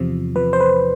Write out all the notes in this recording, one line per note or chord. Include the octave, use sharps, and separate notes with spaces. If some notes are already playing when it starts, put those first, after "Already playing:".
Already playing: E2 C3 F3
E2 C3 F3 B4
C5
B4